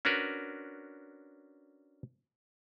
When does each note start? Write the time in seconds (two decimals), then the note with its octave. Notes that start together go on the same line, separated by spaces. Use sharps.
0.05 C#4 D4 F#4 A#4 B4